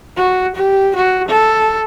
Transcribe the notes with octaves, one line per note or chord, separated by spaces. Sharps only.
F#4
G4
F#4
A4